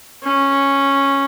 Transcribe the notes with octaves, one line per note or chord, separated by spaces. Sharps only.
C#4